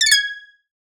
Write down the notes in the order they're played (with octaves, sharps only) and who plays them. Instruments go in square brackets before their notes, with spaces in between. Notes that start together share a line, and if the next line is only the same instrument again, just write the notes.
[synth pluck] A6
C#7
G#6